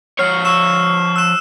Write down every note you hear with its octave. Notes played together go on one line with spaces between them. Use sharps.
F3 C#5 F6 C7
C#6 E6 E7
E6 F#6 E7